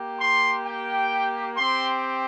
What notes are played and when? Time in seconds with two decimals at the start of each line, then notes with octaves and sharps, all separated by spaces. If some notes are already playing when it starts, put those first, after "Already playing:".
Already playing: A#3 G4
0.20 C6
0.64 G5
1.55 C4 G4 C6